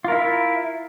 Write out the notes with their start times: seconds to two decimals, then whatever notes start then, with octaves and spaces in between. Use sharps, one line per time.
0.04 F4
0.08 A#4
0.12 E4
0.15 E5